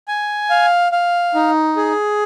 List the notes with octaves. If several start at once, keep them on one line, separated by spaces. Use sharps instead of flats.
G#5
F5
F5
D#4
G#4